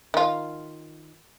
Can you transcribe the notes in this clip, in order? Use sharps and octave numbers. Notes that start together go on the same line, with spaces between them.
D#3 F4